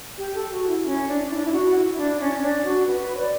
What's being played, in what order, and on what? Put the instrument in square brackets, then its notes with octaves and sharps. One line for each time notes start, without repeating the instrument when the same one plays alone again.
[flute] G4
A4
F#4
E4
C#4
D4
E4
D4
E4
F#4
E4
D4
C#4
C#4
D4
F#4
B4
C#5
D5